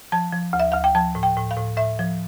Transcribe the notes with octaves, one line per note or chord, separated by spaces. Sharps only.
F3 A5
F3
D2
E5
D2 F5
G5
F3 A5
A2
G5
A2
F5
A2
A2 E5
F3